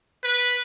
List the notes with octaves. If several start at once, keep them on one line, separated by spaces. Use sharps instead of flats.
B4